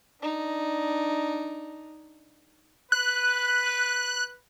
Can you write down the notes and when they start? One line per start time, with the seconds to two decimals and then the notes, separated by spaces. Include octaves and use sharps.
0.20 D4 D#4
2.92 B4 F#6